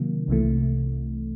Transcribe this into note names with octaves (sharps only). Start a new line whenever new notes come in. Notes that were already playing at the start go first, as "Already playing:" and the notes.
Already playing: C3 D#3 F#3 A#3
C2 C3 E3 A3